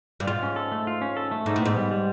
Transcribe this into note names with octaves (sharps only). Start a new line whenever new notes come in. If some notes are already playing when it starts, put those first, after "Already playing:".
G2
G#2 F4
C#4
A4
A3
F4
C#4
A4
A3
G#2 D#4
A2
G#2 B3
G3
G3